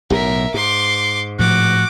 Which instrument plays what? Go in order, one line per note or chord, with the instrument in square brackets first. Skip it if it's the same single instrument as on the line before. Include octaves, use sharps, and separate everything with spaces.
[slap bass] B1 A2 [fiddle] A#4 E5
[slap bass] G#2 [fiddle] C6 D6
[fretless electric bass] A2 F3 [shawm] F#4 [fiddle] D6